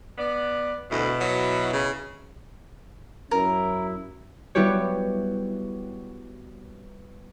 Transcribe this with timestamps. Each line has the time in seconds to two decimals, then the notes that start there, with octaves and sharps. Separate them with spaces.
0.18 B3 D5
0.91 D2 B2 E4
1.20 F#3
1.72 C#3
3.31 F#2 C#4 E4 A#4
4.55 G3 B3 E4 F#4 G4 C#5